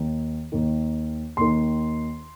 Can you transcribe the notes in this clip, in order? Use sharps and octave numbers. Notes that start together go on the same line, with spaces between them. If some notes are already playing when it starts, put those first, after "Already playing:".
Already playing: D#2 D#3
D#2 D#3
D#2 D#3 C6